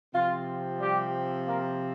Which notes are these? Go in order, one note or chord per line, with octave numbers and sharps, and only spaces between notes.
C3 F3 C4 F4
G3 G4
A#3 A#4